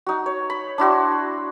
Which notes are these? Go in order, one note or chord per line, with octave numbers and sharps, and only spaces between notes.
D#4 F#4
C#5
B5
D4 E4 F#4 C6